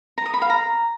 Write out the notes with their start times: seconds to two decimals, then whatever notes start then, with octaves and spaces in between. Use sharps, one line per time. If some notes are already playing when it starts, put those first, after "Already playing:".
0.18 A#5
0.26 D#6
0.34 B5
0.42 F5
0.50 A#5